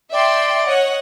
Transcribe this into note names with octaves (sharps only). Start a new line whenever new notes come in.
D5 E5 G5 C6
C#5 D#5 F#5